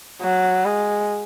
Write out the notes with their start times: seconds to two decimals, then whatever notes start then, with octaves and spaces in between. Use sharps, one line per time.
0.22 F#3
0.65 G#3